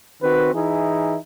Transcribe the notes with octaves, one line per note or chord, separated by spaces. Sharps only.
D#3 C4 F#4 B4
E3 D#4 E4 G#4